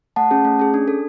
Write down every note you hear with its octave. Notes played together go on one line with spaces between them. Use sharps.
A3 F#5 A5
C#4 G#4
A3
C#4 G#4
D4
A4